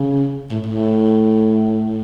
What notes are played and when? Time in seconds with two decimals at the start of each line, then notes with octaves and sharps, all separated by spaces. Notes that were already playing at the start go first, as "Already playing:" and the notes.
Already playing: C#3
0.51 A2
0.67 A2